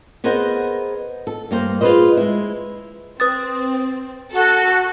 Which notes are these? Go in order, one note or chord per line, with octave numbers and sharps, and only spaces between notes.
B3 G#4 A#4 C5 D#5 F#5
A4
G2 A#3 C5
F4 G#4 A4 B4 C5 D#5
G#3 E4
C4 B4 D#6 A6
F#4 A4